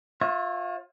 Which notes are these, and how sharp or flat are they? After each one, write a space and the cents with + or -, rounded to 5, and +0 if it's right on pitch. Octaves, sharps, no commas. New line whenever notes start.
F4 +25 C#5 -30 E5 +0